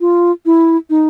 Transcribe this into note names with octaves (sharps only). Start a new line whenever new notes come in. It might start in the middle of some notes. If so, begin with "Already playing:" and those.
F4
E4
D#4